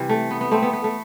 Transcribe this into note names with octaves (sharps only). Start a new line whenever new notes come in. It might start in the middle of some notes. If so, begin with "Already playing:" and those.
Already playing: C3 E3 G3
A3
B3
B3
A3 C4
B3
B3
A3